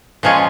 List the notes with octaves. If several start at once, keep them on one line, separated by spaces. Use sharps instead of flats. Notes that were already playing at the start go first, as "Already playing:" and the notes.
A#2 F3 G#3 C#4 F4